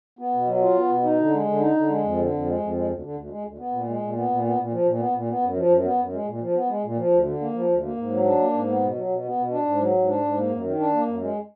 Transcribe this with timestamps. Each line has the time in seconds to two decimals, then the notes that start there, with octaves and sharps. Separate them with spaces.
0.19 B3
0.34 B2
0.47 F#3
0.62 F4
0.76 B3
0.89 B2
1.04 D#4
1.19 D3
1.33 G#3
1.46 D3
1.61 D#4
1.75 D3
1.89 G#3
2.03 F2
2.17 D3
2.31 F2
2.46 G#3
2.60 F2
2.74 G#3
2.88 D2
3.02 D3
3.16 D2
3.30 G#3
3.44 D2
3.58 B3
3.72 A#2
3.87 G#3
4.00 A#2
4.15 B3
4.29 A#2
4.44 B3
4.58 A#2
4.72 F3
4.86 A#2
4.99 B3
5.14 A#2
5.29 B3
5.42 F#2
5.56 F3
5.70 F#2
5.84 B3
5.99 F#2
6.13 G#3
6.26 A#2
6.41 F3
6.55 B3
6.69 G#3
6.84 A#2
6.97 F3
7.11 D2
7.25 D3
7.40 A#3
7.53 F3
7.69 D2
7.83 A#3
7.97 G#2
8.10 F#3
8.24 D4
8.39 A#3
8.53 G#2
8.67 B3
8.81 B2
8.95 F#3
9.09 B2
9.24 B3
9.38 B2
9.52 D4
9.66 G#2
9.80 F#3
9.94 G#2
10.08 D4
10.22 G#2
10.37 A#3
10.50 F#2
10.64 D#3
10.79 D4
10.93 A#3
11.07 F#2
11.21 G#3